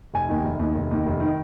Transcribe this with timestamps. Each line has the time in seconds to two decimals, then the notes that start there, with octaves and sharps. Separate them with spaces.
0.14 F1 G#5
0.29 D#2 D#3
0.44 F1
0.59 D#2 D#3
0.75 F1
0.91 D#2 D#3
1.06 F1
1.20 D#3